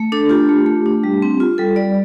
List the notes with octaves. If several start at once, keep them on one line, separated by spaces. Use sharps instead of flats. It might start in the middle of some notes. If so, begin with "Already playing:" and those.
Already playing: A3
D4 A4
F4 G4
A3
A3
D4
G3
C4
F4
G3 A4
G3 D5